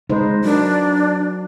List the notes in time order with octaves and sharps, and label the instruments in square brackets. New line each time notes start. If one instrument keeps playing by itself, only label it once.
[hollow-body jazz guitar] C#2 G#3 [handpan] D#4 B4 C5
[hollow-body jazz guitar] F#3 A#4 [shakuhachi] D4